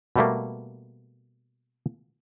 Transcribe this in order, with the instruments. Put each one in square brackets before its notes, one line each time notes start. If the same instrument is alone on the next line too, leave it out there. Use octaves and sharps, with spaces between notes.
[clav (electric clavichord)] B2 G3 A3 A#3